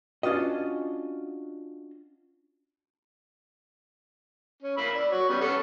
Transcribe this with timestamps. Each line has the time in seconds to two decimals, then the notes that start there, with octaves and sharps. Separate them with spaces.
0.23 C#4 D4 F4 F#4 D#5
4.63 C#4
4.78 A#3 B5 E6
4.94 D5
5.12 F#4 C#5
5.29 G3 B3 C#4
5.41 B3 C#4 A4